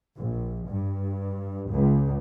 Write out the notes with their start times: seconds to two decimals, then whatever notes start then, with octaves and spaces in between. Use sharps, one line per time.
0.17 A#1
0.68 G2
1.72 C#2